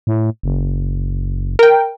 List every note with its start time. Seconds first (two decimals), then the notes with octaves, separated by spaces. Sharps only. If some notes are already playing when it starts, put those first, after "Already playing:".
0.07 A2
0.43 F#1
1.59 A#4 G5